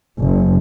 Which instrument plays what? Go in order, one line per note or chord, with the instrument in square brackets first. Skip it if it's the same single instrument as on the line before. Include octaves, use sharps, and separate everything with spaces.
[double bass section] F#1